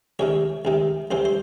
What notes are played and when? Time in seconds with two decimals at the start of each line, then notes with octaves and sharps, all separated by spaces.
0.19 C#2 C3 D#3 C#5
0.65 C#2 C3 D#3
1.11 C#2 C3 E3 C5
1.25 C5